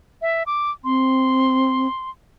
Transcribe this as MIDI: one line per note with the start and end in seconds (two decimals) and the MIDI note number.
0.22 0.43 76
0.46 0.71 86
0.84 1.88 60
0.84 2.10 84